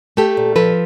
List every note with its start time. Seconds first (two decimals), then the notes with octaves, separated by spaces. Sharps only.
0.17 A3 G4 A4
0.37 A#2
0.56 F3 A4 B4